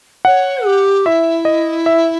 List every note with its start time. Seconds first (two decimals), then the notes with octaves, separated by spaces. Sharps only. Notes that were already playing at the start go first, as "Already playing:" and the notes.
0.25 C#5 F#5
0.65 G4
1.06 E4 E5
1.45 D#5
1.86 E5